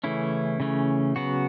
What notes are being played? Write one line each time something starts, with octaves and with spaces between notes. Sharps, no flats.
C#3 E3 A3 C#4 E4
C#3 E3 A3 C#4
C#3 F#3 B3 F#4